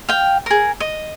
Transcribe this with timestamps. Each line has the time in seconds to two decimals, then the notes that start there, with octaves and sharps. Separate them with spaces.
0.09 F5 G5
0.46 G#4 A#4
0.80 D#5